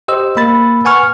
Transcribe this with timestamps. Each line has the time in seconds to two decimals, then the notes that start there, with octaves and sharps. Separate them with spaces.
0.08 G4 C5 D#5 E6
0.37 A#3 B5 E6 A6
0.84 B4 F#5 G#5 C#6 F6